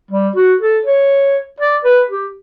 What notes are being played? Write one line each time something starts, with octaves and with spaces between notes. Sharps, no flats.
G3
F#4
A4
C#5
D5
B4
G4